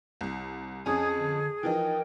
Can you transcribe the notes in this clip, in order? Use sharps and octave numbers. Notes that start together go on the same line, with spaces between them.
C2
F2 C#4 G#4 G#5 D#6 G#6
D3
E3 F3 D#4 A#4 G5